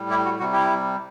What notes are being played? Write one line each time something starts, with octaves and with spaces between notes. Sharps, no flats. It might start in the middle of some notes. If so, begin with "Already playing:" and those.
Already playing: A2 G3
E4 G4
F#4
C3 G3 F#4
E4 G4